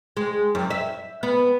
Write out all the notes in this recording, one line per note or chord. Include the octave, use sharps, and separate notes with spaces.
G#3
F#2
E5
B3